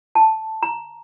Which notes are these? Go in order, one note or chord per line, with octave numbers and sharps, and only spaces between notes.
A5
A#5